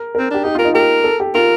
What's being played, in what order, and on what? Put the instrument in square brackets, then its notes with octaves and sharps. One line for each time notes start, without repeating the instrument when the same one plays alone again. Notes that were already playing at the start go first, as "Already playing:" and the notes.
Already playing: [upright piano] A#4
A#4
[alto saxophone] C4
[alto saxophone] D4 [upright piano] G4
[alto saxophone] D#4 [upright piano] G4
[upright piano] F4 [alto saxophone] A#4
[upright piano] D#4
[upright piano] G4 [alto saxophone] A#4
[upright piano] A4
G4
[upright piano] F4 [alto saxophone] A#4